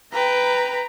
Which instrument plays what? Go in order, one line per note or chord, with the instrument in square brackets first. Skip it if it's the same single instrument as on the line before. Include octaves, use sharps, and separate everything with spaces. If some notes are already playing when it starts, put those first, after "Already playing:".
[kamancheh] B4 G5 [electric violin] A#5